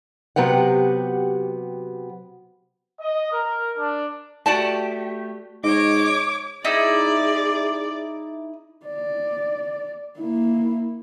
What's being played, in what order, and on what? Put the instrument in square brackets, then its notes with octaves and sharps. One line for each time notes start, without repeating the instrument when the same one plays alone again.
[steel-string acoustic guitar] C3 F#3 B3 G4 F#5
[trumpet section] D#5
A#4
D4
[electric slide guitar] A3 G4 [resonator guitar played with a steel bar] F#4 D5 A5
[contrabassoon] G#2 [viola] C#5 D6 [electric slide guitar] D#5
[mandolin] D#4 E4 [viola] G#4 D5
[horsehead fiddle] D5
A#3 E4